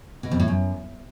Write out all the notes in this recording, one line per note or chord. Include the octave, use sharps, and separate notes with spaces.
B2
F2
A2
F#2